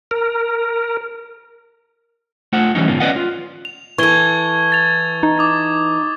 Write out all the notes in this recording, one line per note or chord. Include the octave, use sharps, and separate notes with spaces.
A#4
A3 F4 C5 F#5
E3 F#3 G3 C#4 D#4
E2 G#2 D3 F3 A#3 B3
C#4 B4 D5 D#5 F5 F#5
F4
F7
E3 A4 C#6 G#6 G7
A6 F7
D#4
D6 D#6 A6